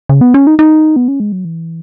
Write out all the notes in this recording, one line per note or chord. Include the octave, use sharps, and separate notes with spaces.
C#3
B3
C#4
D#4
D#4
B3
C#4
G#3
F#3
E3